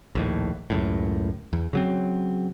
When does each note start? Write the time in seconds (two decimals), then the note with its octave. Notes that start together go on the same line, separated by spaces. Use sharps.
0.15 A#1 D#2 A2
0.70 C#2 F#2 A2
1.53 E2
1.73 C#3 F#3 C4